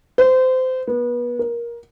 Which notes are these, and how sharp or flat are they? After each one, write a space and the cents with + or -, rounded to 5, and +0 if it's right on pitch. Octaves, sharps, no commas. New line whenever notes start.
C5 -25
B3 -30
A#4 +15